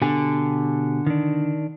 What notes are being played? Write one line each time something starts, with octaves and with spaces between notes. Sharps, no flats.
B2 D3 G4 G#5
D#3 D4